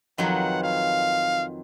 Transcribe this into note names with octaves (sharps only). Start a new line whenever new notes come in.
F2 D#3 F#3 B3 F#5
F5